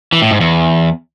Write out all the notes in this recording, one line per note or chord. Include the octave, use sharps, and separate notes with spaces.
E3
A2
G#2
E2